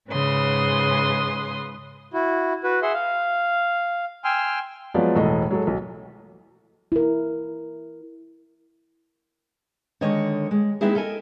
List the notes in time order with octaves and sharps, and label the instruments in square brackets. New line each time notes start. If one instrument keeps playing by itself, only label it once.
[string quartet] G#2 C#3 B4 C6 D#6
[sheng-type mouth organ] E4 F#4
F#4 B4
G#4 E5 F#5 C6
F5
G5 G#5 C6 E6 F6
[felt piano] F3 F#3 G#3 B3 D5
E1 A2 A4 D#5
F#3 G#3 A4
B1
[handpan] E4 A#4
[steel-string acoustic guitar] D3 D#3 G#3 C#5 D#5
G#3
G#3 B3 C4 D#4 E4 G#4
A4 A#4 D#5 G#5